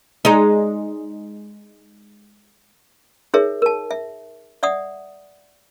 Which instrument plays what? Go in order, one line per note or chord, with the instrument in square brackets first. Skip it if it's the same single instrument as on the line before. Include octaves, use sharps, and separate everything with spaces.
[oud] G#3 D#4
[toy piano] D#4 G#4 A#4 C#5 E5
A#4 A5
E5
D5 E5 F#5 D#6